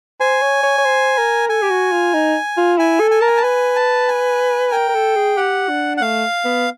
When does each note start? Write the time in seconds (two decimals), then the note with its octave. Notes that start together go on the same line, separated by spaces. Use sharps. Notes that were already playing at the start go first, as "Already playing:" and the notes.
0.20 C5 G#5
0.42 C#5
0.63 C#5
0.78 C#5
0.85 C5
1.18 A#4
1.49 A4 G#5
1.62 G4
1.70 F#4
1.92 F4
2.14 D#4
2.57 F4
2.78 E4 G#5
3.00 A4
3.11 G#5
3.20 A#4 A5
3.27 G#5
3.37 A5
3.43 B4 G#5
3.76 A5
4.08 G#5
4.72 A#4 G5
4.89 A#4
4.95 A4
5.16 G#4
5.37 G4 F#5
5.69 D4
5.97 F#5
6.01 A3 F5
6.45 B3